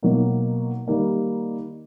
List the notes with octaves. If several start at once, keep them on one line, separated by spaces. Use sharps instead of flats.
B2 F#3 A#3 D#4
D#3 G3 A#3 D#4